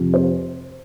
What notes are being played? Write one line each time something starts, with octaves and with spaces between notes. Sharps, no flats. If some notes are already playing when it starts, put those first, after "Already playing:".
Already playing: F2 C3 F3 C4
C5